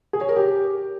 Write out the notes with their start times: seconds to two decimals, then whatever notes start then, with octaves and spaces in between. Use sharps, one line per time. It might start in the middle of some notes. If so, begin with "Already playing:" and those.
0.13 G#4
0.21 C#5
0.29 A#4
0.36 G4